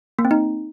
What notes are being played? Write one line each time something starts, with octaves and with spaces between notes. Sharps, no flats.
A#3
C4
D#4